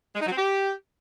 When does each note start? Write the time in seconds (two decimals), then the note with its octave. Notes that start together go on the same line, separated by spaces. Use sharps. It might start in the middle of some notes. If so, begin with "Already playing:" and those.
0.15 G#3
0.21 D#4
0.26 F#3
0.32 C4
0.37 G4